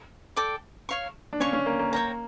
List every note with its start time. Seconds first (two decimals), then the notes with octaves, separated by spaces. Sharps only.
0.36 A4 D5 G5 D6
0.89 C#5 F5 C#6
1.33 D4
1.40 C#4 C#5 F5 C#6
1.53 C#4
1.66 A#3
1.79 A#3
1.92 A#3 C#5 G5 A#5